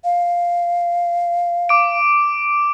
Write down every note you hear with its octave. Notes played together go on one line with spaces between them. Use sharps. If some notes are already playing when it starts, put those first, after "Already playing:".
F5
D6 D7